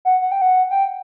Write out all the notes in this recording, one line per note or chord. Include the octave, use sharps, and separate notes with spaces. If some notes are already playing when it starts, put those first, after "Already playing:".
F#5
F#5
G5
F#5
G5